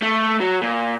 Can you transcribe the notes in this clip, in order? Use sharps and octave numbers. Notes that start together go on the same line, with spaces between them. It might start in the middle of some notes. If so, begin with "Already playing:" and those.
A3
F#3
A#2